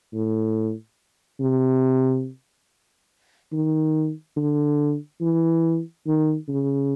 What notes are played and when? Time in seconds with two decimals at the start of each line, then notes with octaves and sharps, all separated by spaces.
0.13 A2
1.40 C3
3.52 D#3
4.37 D3
5.21 E3
6.06 D#3
6.48 C#3